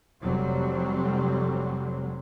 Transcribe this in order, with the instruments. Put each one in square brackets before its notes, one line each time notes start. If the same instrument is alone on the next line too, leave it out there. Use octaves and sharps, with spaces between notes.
[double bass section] F1 F#3 G3 C4